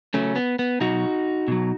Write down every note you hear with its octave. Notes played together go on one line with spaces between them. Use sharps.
C#3 F#3 A3 C#4
B3
B3
B2 F#3 D#4 F#4
B2 F#3